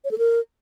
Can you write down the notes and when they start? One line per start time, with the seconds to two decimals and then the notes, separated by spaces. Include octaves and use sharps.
0.04 C#5
0.11 A4
0.18 A#4